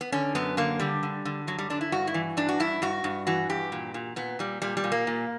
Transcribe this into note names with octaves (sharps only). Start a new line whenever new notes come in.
B3
D3 C#4
F#2 B3
D3 A#3
D3 G3
D3
D3
F#2 F#3
G3
D3 D4
E4
G2 F#4
E4
E3
G2 D4
F#4
G2 E4
G2 F#4
G2
E3 F#4
G2 G4
A#2
A#2
A#2 B3
A#2 G3
A#2 G3
G3
A#2
A#3
A#2